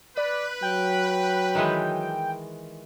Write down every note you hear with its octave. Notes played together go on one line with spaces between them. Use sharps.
B4 D5
F#3 G5
D#3 E3 G#3